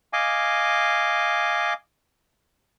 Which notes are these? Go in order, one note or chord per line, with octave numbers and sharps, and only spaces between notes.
D#5 F5 G#5 D6